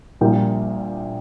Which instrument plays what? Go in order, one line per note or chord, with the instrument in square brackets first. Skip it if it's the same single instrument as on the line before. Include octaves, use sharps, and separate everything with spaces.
[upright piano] A#1 A#2 G3 A#3 G5